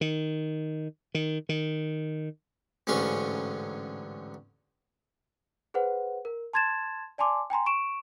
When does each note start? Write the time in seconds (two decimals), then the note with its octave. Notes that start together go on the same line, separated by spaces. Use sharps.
0.01 D#3
1.15 D#3
1.49 D#3
2.87 A1 G#2 D3 C#4 F4 C#6
5.74 G#4 B4 C5 F#5
6.25 A#4
6.53 A5 C6 G#6 A6 E7
7.18 D5 G#5 A5 C6 D6
7.50 G5 G#5 A#5 C6
7.66 C#6 D7 E7